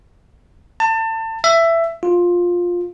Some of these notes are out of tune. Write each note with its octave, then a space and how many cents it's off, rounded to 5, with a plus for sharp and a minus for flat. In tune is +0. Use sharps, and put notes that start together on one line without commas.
A5 +30
E5 +15
F4 +10